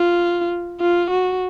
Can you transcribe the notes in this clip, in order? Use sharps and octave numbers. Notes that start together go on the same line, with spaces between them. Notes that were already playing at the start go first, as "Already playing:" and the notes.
Already playing: F4
F4
F#4